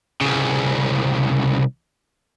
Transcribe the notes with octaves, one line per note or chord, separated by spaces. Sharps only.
C2 C#3